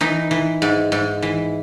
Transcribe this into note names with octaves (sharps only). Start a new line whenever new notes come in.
E3 D#4
E3
G#2
G#2
E3